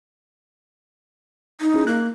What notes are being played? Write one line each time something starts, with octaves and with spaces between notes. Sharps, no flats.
D#4
C#4 E4 G#4
A#3 F#6